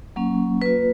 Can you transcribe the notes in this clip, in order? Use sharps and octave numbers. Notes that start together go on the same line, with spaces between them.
F#3 A#3 C#4
A#3 F4 B4